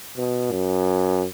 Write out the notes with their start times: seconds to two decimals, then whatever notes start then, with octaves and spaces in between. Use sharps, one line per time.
0.17 B2
0.51 F#2